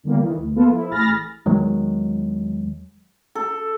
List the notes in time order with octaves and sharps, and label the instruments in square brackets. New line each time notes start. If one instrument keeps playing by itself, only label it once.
[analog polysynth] E2 D3 G3 A#3
D#3 E3
D2
A#3 B3 F4 A4
F3 E4
A1 G#4 B5 F6 A6 A#6
[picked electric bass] E2 D#3 F#3 G#3
[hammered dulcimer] A4